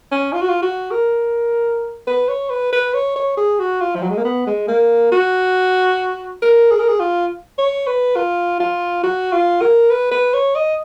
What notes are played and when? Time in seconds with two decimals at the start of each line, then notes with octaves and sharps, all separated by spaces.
0.11 C#4
0.33 F4
0.41 F#4
0.49 F4
0.62 F#4
0.91 A#4
2.07 B4
2.28 C#5
2.50 B4
2.72 B4
2.94 C#5
3.16 C#5
3.37 G#4
3.59 F#4
3.81 F4
3.95 F3
4.03 F#3
4.10 G#3
4.17 A#3
4.25 B3
4.47 G#3
4.68 A#3
5.12 F#4
6.42 A#4
6.71 G#4
6.80 A#4
6.88 G#4
6.99 F4
7.58 C#5
7.87 B4
8.16 F4
8.60 F4
9.03 F#4
9.32 F4
9.61 A#4
9.90 B4
10.11 B4
10.34 C#5
10.55 D#5